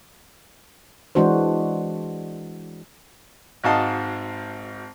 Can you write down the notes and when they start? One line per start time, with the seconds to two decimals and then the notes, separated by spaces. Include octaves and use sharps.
1.15 E3 G#3 D4 F#4 C5
3.64 G#1 G#2 F#4 D#5 F5 A5